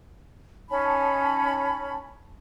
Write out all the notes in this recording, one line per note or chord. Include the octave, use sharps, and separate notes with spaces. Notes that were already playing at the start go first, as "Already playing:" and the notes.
C#4 D#4 A5 B5